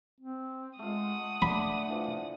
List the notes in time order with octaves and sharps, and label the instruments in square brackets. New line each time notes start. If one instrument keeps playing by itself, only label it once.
[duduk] C4
[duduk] G#3 [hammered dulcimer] A3 F4 [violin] F#5 D#6
[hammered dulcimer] D3 D5 [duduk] A3 [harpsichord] B5
[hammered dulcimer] D3 E3 F3